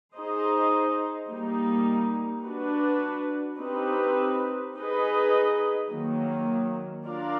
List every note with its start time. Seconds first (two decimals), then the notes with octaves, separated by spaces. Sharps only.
0.15 D#4 G#4 C5 D#5
1.29 G3 A#3 D#4
2.45 D4 F#4 B4
3.59 C4 D#4 G4 B4
4.75 D#4 G#4 B4 D#5
5.90 D#3 F#3 A#3
7.05 D4 F4 A#4 D5 F5